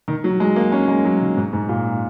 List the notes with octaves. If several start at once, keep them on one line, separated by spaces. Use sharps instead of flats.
D#3
F#3
G#3
A#3
C#4
G#3
F#3
D#3
G#2
G#2
A#2